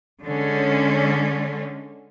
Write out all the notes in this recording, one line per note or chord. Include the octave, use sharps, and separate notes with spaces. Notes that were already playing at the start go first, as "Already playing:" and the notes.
D3 G#3 C#4